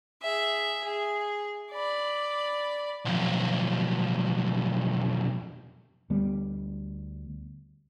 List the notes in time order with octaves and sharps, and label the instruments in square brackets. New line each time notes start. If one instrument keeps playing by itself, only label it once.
[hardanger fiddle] G#4 E5
G#4
D5 B5
[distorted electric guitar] B1 F2
[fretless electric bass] D2 G3 B3